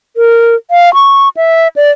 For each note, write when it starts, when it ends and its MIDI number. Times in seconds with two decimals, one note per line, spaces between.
0.16 0.55 70
0.71 0.93 77
0.94 1.29 85
1.37 1.68 76
1.76 1.91 74